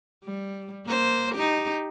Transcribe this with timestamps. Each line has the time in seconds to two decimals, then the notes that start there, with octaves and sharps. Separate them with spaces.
0.24 G3
0.86 A#3 C5
1.34 D#4 G4